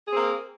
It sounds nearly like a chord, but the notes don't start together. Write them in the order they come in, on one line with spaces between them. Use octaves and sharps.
G#4 C4 A#3